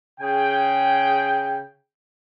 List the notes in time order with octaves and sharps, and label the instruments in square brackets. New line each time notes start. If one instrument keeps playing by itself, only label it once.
[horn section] C#3 G#4 G5